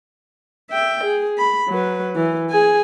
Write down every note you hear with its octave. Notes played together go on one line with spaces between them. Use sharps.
E5 G5
G#4
B5
F#3 B4
E3
G#4 G#5